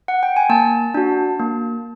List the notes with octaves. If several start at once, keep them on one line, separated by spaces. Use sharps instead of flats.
F#5
G5
G#5
A#3 A5
D4 F#4
A#3